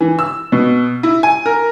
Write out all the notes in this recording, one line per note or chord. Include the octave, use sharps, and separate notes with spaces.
E3
E6
B2
E4
G#5
A#4